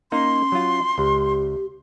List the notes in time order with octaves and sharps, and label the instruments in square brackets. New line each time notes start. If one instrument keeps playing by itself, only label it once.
[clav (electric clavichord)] A#3 D#4 [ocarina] C#4 [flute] C6
[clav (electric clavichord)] F#3 F4
[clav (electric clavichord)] C#2 [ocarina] G4